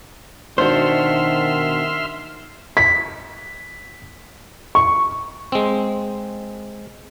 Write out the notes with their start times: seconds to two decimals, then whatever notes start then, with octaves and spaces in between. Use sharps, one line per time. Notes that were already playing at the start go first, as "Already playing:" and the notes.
0.58 B2 D#3 D4 F#4 C5 E5 C6 F6
2.77 B6
4.75 C#6
5.52 G#3 C4